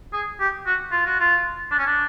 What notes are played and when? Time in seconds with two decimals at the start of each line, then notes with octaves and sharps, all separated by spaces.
0.13 G#4
0.40 G4
0.66 F#4
0.92 F4
1.06 F#4
1.20 F4
1.71 D4
1.78 C#4
1.86 D4